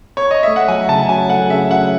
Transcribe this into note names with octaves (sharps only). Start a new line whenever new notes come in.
C#5
D#5
A3 E5
F#5
F#3 G#5
C#3 A5
F#3 G#5
A3 F#5
C#3 E5
F#3 F#5